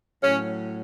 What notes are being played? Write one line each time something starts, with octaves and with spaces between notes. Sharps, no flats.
A2 F#3 C#4